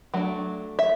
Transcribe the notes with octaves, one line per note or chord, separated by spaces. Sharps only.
F#3 A3 D4
E5